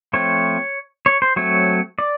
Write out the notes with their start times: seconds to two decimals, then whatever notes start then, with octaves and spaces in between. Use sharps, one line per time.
0.13 F3 A3 C4 C#5
1.06 C#5
1.22 C5
1.36 F#3 A3 C4 C#5
1.99 D5